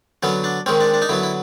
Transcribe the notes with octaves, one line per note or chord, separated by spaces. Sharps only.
D3 F#3 B3 C#4
D4
D#3 G#3 C4 C#4
D4
D4
D#4
D3 F#3 B3 E4
E4